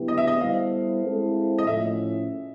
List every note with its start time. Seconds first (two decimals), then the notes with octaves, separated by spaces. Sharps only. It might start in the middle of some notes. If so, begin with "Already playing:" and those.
Already playing: D3 F#3 B3 E4 G4
0.08 D#5
0.18 E5
0.27 D#5
0.40 G3 B3 E4 A4 C5 F5
1.04 G#3 C4 E4 A4 C5
1.58 D#5
1.67 A2 F3 A3 C#4 E5